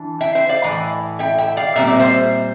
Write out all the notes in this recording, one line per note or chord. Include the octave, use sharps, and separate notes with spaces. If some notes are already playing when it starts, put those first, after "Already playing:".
Already playing: E3 D4
E5 G5
C5 E5
D5 F5
A2 E3
E5 G5
E5 G5
D5 F5
A#2 G3 C4 E5
D5
C5 E5